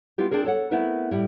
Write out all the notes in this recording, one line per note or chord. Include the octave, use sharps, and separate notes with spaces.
B3 E4 F4 G4
C4 D4 F4 G#4 A#4
A4 C#5 F#5
A3 B3 C4 E4 A#4 B4
A2 G3 E4